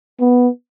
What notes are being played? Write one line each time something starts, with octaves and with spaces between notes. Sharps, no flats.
B3